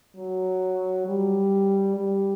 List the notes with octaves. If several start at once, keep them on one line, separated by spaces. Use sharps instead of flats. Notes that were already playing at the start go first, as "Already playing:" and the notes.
F#3
G3
G3